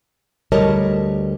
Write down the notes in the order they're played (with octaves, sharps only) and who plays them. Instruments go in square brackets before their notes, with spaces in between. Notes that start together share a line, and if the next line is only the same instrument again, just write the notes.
[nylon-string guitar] D2 G3 A#4 C#5 D#5 A5